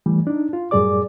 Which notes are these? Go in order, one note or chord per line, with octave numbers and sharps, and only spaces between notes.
E3 G3 A3
D4 D#4
F4
F#2 A2 G3 G#4 D5 D6